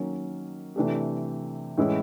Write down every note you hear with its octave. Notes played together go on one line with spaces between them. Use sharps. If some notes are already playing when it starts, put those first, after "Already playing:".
Already playing: D#3 F#3 A#3 C#4
C3 E3 A3 D4 G4
A2 E3 G#3 C#4 E4